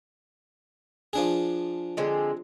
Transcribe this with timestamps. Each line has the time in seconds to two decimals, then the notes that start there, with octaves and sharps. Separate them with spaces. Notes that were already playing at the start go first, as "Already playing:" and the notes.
1.13 F3 D4 G#4
1.97 D3 G#3 C4